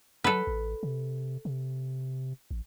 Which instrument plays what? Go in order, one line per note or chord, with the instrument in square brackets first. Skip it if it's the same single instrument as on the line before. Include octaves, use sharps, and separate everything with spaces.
[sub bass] F#3 [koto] A4 B4
[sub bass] A1
C3
C3
A1